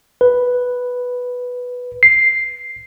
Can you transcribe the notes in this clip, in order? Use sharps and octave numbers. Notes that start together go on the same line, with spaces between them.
B4
C7